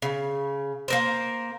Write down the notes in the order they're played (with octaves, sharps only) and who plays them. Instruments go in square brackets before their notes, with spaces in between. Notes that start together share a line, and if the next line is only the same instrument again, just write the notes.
[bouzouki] C#3
A#3 A#4 C5